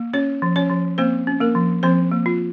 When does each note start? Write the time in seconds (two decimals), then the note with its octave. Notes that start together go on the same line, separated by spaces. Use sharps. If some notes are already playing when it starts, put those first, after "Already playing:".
Already playing: A#3
0.13 C#4 C#5
0.42 F3
0.56 C#4 C#5
0.70 F3
0.98 A#3 C4 C5
1.27 C#4
1.40 A#3 A#4
1.55 F3
1.83 F3 C4 C5
2.12 A#3
2.26 F4